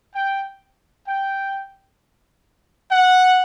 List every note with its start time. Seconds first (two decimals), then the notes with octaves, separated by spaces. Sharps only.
0.15 G5
1.08 G5
2.92 F#5